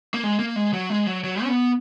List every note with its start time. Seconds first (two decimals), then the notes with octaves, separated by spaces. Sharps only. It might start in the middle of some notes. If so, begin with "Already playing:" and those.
0.14 A#3
0.23 G#3
0.39 A#3
0.56 G#3
0.73 F#3
0.90 G#3
1.06 F#3
1.24 F#3
1.43 C#4
1.48 B3